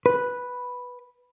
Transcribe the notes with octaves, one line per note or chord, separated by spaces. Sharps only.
B4